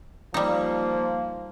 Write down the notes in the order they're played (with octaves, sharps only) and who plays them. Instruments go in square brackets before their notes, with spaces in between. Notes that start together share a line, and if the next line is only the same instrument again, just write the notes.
[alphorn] F3 [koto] G3 D#4 [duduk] A#3